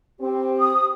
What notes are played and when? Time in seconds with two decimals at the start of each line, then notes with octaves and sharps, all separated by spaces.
0.20 C4 G4
0.59 D#6